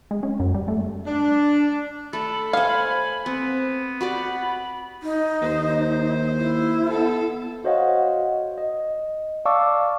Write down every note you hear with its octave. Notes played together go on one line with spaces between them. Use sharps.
G#3
C#4
F#2
G3
A3
D4
A3 A4 B5
C5 C#5 F5 G#5
B3 C4
F#4 G4 D5 B5
D#4
D#2 C5
E4
B3 A4
F#4 C5 C#5 D#5 F5 F#5
D#5
D5 F5 A5 C#6 D6 E6